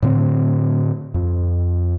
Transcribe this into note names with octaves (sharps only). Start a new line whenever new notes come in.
A2 D3 C4
F2